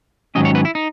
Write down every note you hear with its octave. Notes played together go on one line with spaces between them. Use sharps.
G#2 D#3 F#3 C#4 D#5
C#5
B4
E4
D#4